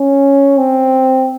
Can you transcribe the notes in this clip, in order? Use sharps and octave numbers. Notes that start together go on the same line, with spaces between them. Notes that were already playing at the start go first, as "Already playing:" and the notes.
Already playing: C#4
C4